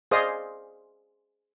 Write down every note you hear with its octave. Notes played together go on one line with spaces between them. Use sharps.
G#4 C5 D5 D#5 F5 D#6